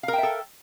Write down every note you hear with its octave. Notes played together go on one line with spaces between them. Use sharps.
A4 A#4 E5 F5 G5